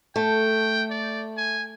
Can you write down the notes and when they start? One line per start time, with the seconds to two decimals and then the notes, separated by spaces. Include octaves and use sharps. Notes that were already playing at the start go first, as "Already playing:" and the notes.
0.16 A3 G5
0.90 D5
1.37 G#5